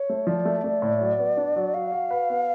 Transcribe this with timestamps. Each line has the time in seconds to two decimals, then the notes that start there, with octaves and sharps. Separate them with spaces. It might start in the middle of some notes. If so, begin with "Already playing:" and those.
Already playing: C#5
0.09 A3
0.27 F3 D5
0.45 A3
0.64 A3
0.82 A2
1.01 F#3
1.19 B3
1.37 D4
1.56 F#3
1.74 F#4 F5
1.92 F#4
2.11 B4
2.30 B3